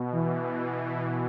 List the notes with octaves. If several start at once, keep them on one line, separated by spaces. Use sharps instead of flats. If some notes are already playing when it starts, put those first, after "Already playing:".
Already playing: B2
E3